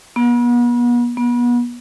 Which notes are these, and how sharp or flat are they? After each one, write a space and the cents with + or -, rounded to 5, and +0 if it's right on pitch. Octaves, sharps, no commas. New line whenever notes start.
B3 -40
B3 -35